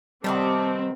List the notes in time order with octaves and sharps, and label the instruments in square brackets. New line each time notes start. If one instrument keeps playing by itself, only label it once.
[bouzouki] C3 D#3 B3 [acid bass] G3 [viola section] C4 [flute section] A5 D6